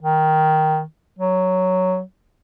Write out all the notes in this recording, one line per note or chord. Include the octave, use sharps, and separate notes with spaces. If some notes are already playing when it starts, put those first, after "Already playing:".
D#3
F#3